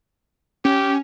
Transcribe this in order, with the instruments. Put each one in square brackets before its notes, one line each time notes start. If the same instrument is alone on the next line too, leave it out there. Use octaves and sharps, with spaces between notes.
[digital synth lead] C#4 [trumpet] G4